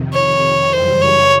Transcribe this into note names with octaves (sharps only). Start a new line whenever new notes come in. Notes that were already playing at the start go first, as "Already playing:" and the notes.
Already playing: F2 C3 D#3
C#5
F#2 C#3 E3 G3 C5
C#5